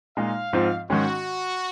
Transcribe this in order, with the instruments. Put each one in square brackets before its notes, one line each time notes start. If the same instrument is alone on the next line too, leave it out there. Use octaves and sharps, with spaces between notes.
[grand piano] A#2 G#3 D#4 [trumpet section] F5
[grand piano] G#2 F3 C4 F4
[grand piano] G#2 D#3 G#3 C#4 [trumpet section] F#4